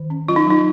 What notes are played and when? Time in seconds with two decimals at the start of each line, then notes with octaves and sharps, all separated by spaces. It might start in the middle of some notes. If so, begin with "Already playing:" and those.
Already playing: D#3
0.10 C#4
0.28 F#3 F4
0.36 D#4
0.47 F#3 D#4